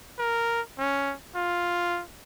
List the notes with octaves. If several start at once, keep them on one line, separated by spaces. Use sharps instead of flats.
A#4
C#4
F4